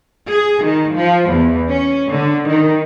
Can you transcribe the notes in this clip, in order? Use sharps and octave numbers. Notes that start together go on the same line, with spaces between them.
G#4
D#3
F3
E2
C#4
D3
D#3